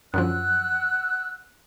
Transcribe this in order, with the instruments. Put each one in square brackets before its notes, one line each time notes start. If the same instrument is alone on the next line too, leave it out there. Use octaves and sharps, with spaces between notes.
[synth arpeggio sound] F#2 D3 F3 [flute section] F#5 E6 F#6